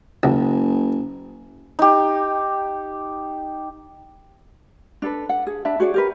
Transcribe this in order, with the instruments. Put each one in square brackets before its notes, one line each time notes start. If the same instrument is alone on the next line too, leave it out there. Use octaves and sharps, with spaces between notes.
[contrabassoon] F#1 [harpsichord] C#2
[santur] D#4 G4
[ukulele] D4 A4 B4
F#5
G#4
D4 E5 A5 B5
F#4 G#4 C#5 D5
G4 A#4 B4